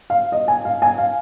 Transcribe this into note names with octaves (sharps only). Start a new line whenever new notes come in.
F5
D#5
G#5
F5
G#5
F5